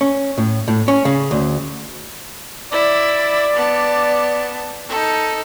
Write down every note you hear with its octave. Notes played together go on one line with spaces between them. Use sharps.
C#4
A2
A2
C#4
C#3
D2
E4 D5
B3 A5
D#4 A4